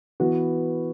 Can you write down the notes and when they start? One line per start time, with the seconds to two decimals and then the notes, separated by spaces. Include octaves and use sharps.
0.20 E3 B3 F#4